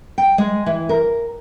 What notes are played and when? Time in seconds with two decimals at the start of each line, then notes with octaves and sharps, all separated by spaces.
0.18 G5
0.38 G#3
0.66 E3
0.89 A#4